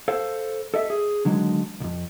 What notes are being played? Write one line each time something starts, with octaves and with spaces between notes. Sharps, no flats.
A4 C5 F5
A4 D#5 E5
G#4
D3 D#3 F#3 G#3
B1 F2